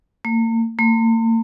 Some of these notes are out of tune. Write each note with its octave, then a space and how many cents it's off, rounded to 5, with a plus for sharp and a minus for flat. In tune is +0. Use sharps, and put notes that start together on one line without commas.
A#3 -40
A#3 -45